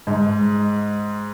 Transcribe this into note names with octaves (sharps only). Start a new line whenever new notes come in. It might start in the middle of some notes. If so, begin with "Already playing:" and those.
G#2